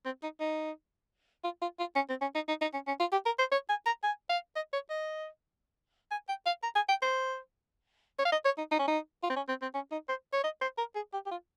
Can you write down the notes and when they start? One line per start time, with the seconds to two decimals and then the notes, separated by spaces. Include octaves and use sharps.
0.05 C4
0.23 D#4
0.40 D#4
1.44 F4
1.62 F4
1.79 F4
1.96 C#4
2.09 C4
2.21 C#4
2.35 D#4
2.48 D#4
2.61 D#4
2.74 C#4
2.87 C#4
3.00 F4
3.12 G4
3.26 A#4
3.39 C5
3.52 C#5
3.69 G#5
3.86 A#5
4.03 G#5
4.29 F5
4.56 D#5
4.73 C#5
4.90 D#5
6.11 G#5
6.28 G5
6.46 F5
6.63 A#5
6.76 G#5
6.89 G5
7.02 C5
8.19 C#5
8.25 F5
8.32 D#5
8.45 C#5
8.58 D#4
8.71 D#4
8.79 C#4
8.88 D#4
9.23 F4
9.30 C4
9.36 C#4
9.48 C4
9.62 C4
9.74 C#4
9.92 D#4
10.09 C5
10.33 C#5
10.44 D#5
10.62 C5
10.78 A#4
10.95 G#4
11.13 G4
11.26 G4
11.31 F4